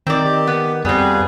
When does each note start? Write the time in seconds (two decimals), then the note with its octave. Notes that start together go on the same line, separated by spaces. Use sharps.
0.07 D#3 C4 D5
0.24 G4
0.47 B3
0.85 F2 G3 B3 C4 G#4